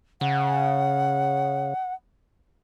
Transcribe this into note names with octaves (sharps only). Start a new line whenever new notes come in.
C#3 F#5